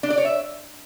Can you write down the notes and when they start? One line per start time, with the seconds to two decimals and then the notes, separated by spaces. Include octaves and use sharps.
0.03 D4
0.10 D5
0.18 C#5
0.25 E5